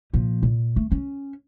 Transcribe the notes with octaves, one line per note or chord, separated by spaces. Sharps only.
A#2 F3
A#2
A3
C#4